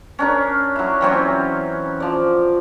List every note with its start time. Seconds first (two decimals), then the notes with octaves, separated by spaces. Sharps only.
0.19 C#4 D4 A#4
0.76 F#3 E4
1.01 E3 F#3 C4 C#4
2.00 F3 D5